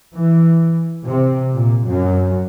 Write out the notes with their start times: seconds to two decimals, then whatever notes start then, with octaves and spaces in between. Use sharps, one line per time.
0.14 E3
1.05 C3
1.55 A#2
1.88 F#2